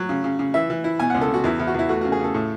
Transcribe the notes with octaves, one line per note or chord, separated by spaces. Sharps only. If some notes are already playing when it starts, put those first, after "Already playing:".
Already playing: F#3
C#3
C#3
C#3
E3 E5
E3
E4
B2 G#5
F#5
C#2
A4
B2 F#4
E2 E4
E2
F#4
E2 E4
A3 F#4
F#4
C#3
G#4
C#3 A4
A2